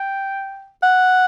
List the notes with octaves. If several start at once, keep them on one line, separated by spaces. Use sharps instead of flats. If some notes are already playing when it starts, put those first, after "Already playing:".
Already playing: G5
F#5